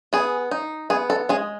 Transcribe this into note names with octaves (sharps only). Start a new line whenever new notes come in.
B3 G#4
D#4
B3 G#4
A4
G#3 G#4